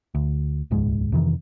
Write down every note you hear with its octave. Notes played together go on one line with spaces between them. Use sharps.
D2
D#1 C#2 G#2 G#3
F2 C3 D#3 E3